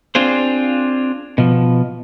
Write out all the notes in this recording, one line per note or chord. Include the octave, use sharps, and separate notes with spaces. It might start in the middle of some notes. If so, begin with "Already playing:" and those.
C4 D4 F4 G#4 C5
B2 F3